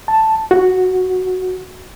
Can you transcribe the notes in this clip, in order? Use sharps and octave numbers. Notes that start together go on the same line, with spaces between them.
A5
F#4